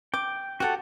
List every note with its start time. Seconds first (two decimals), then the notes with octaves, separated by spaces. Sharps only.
0.14 G5 D6
0.60 F#4 G4 A4 F#5